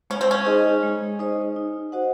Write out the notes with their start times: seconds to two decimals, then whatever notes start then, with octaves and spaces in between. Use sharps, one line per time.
0.10 G#3 C#4
0.21 C4
0.31 C#4
0.46 D#4 G#4 C5 D#5
0.83 G#3
1.19 D#4 G#4 C5 D#5
1.56 D#4
1.92 F#4 C5 D#5 F#5